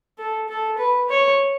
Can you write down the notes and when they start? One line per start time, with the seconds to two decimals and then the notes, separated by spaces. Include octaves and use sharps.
0.18 A4
0.49 A4
0.78 B4
1.09 C#5